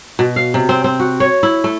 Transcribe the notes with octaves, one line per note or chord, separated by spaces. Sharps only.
B2
F5
C3
C4
C4
F#4
C#5
E4
A3